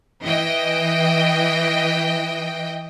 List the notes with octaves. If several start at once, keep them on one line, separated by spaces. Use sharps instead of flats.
E3 D#5 G5